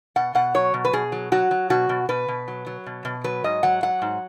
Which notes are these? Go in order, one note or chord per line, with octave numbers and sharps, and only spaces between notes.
B2 F#5
B2 F#5
F#3 C#5
B2
B4
B2 G#4
F#3
F#3 F#4
F#3
B2 F#4
B2
B2 B4
B2
F#3
F#3
B2
B2
F#3 B4
G#2 D#5
F#3 F#5
F#3 F#5
G#2